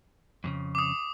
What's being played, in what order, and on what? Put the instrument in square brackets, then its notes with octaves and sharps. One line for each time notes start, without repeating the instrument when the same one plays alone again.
[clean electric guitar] F2 A#2 C#3
[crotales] D6 D#6